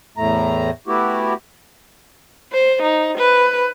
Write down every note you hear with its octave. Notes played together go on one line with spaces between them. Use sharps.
E2 A2 A3 A#5
A3 B3 E4 F#4 G4
C5
D#4
B4